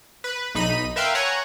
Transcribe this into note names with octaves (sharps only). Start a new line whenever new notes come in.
B4
B1 D#4 B5 D#7
A#4 B4 E5 F5 G5 C6
C#5 F#5 G#5 A#5